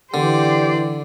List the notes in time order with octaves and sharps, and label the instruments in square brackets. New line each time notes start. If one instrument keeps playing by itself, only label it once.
[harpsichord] D3 [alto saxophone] E3 [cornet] G4 [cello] C5 D5